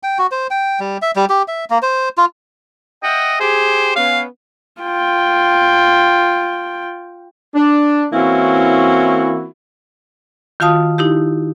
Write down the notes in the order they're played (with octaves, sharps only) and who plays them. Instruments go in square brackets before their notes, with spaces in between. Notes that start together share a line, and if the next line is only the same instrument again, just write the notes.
[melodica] G5
F#4
C5
G5
G3
E5
G3
G4
E5
A#3
C5
F4
[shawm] D#5 [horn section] E5 F#5 G5
[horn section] G4 G#4 [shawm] C5
[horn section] B3 C#4 [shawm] F5
[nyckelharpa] F4 G5
[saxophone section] D4
E3 A#3 C4 C#4 E4 F#4
[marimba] D#3 F4 F#4 F5 A5 D#6
D#4 E4 G4